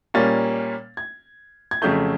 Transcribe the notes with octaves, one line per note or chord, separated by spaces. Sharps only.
A#2 G3 A#3 C#4 A6
G#6
G#6
F2 C#3 F#3 A3 G6